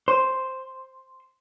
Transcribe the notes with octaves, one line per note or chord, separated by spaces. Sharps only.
C5